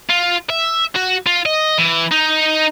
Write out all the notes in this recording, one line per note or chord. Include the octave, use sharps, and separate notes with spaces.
F4
E5
F#4
F4
D#5
E3
D#4